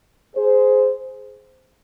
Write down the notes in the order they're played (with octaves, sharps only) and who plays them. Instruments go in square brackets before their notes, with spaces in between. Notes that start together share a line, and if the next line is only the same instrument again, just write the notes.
[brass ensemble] G#4 C5